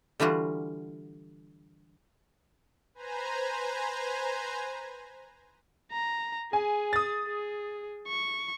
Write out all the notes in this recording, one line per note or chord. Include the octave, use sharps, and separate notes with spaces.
D3 E3 G3 F4 F#4
B4 C5 G#5 A#5
A#5
G#4 G#5
D#6 A6
G#4
C#6